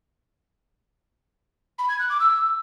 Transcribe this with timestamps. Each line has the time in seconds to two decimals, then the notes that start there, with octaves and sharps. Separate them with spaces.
1.78 B5
1.88 G#6
1.99 F#6
2.09 D6
2.20 E6